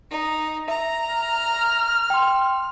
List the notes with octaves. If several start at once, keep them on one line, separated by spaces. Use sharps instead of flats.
D#4
E5 A#5
F6
G5 C6